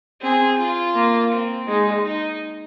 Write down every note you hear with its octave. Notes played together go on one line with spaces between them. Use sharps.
C4 G#4
F4
A#3
C4
G#3 D#4
D#4